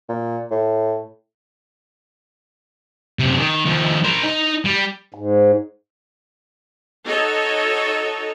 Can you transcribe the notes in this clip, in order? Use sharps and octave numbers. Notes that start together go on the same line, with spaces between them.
A#2
A2
F#2 C3
D#3
D#2 F3
A#4 C5
D#4
G3
G#2
D#4 F#4 A4 C#5 D#5